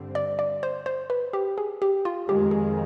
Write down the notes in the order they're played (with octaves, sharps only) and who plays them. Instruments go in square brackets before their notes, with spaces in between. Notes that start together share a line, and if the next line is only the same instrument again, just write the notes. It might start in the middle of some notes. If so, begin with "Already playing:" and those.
Already playing: [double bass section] G2 D3 G3 C4
[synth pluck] D5
D5
C5
C5
B4
G4
G#4
G4
F4
[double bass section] F2 D#3 G#3 [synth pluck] G4
[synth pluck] G#4